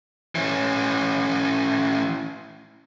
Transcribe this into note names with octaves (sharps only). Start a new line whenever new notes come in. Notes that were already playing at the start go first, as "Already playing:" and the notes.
E3 C#4